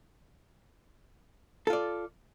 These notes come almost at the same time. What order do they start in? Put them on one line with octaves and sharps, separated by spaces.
A4 F4 D5